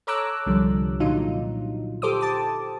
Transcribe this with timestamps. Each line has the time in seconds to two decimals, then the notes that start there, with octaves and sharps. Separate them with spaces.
0.07 A4 C#5 A#5 D6 E6 F#6
0.46 C2 D3 F3 G3
1.00 A#2 D3 F#3 D#4 F4
2.02 G4 A4 C5 D6 D#6
2.21 A5 D6